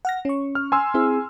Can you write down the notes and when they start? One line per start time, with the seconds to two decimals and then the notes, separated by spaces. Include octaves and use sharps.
0.05 F#5 F6 A#6
0.25 C#4 C#6
0.55 F6
0.72 G#5 C6 E6
0.94 C4 E4 G#4